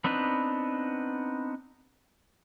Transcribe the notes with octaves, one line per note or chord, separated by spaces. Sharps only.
B3 C4 D4 D#4 B4